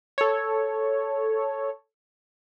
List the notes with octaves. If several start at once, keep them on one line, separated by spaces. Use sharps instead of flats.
A4 C#5